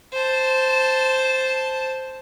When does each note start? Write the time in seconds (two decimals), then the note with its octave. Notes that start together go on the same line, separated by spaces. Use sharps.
0.13 C5 A5